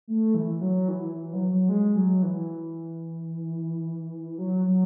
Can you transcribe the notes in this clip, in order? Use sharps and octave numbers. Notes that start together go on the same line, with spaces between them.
A3
E3
F#3
E3
E3
F#3
F#3
G#3
F#3
E3
F#3
F#3